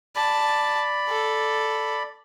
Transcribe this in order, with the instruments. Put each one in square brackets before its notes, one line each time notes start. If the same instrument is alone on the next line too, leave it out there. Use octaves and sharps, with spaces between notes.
[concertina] D5 B5 [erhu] A5
[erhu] A4